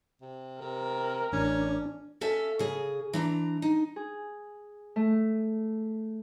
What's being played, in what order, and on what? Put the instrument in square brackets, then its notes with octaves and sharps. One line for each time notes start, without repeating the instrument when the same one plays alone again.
[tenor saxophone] C3
[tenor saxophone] C3 [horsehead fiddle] A#4
[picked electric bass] A1 [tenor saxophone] C#4 [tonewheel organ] D4
[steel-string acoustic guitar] C#4 A4 E5 F5
C#3 G#4
E3 D4 A#5
D#4
[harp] G#4
A3